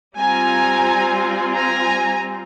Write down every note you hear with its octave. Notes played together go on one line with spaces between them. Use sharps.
G3 C4 F4 G#5 A#5
G#5 A#5